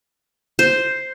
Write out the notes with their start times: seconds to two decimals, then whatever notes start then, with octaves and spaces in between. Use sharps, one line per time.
0.59 C5